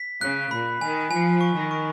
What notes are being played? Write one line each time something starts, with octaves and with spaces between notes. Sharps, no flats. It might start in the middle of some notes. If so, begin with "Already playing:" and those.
Already playing: B6
C#3 F#6
A#2 B5
D#3 G#5
F3 G#5
C#6
D#3
C#6